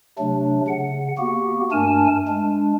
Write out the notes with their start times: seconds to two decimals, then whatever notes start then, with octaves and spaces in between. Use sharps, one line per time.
0.19 C3 F#3 A3 D4
0.68 C#3 F#5
1.18 A#3 B3 F#4 G4
1.72 G2 A3 D4 A#4 G#5 A5
2.28 G#3 D4